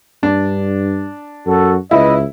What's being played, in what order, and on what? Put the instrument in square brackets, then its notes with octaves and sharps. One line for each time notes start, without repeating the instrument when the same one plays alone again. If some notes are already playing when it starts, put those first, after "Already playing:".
[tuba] G2 [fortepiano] D4
[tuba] F#2 [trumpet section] F#4 A4
[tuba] C#2 [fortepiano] E4 [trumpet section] B4 D#5 B5